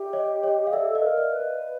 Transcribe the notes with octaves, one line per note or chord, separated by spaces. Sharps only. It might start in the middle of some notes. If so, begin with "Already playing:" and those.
Already playing: G4 D5 E5
C#5 D#5
C#5 D#5
F5
A4 D5 E5
D#5 F5
B4
A#4 F5
D5 E5
B4
D#5 F5